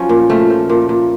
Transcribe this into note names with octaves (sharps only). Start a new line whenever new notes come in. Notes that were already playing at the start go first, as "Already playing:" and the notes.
Already playing: F3 F#3 C#4
A#2
F3 A3
F3
A#2
A#2